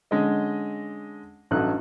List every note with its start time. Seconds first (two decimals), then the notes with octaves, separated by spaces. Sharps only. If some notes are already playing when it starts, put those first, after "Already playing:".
0.11 D3 G#3 C#4 D#5
1.51 A1 G2 F#3 D#4 A4 F#6